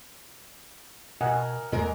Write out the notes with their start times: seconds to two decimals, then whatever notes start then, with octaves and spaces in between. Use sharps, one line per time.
1.21 B2 A#4 D#5 F#5 G#5
1.72 E2 G#3 A#4 A#5